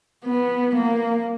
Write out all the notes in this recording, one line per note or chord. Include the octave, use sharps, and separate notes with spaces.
B3
A#3